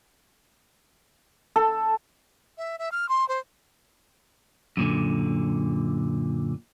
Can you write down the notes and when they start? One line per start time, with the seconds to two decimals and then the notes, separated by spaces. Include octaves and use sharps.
1.56 A4
2.58 E5
2.79 E5
2.92 F6
3.09 C6
3.28 C5
4.77 F#2 A#2 D3